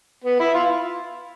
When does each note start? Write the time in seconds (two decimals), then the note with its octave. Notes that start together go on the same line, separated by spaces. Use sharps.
0.24 B3
0.40 E4
0.54 F4